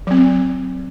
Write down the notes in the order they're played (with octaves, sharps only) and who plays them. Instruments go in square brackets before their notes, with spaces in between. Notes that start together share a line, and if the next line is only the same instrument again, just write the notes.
[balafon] F#3 C4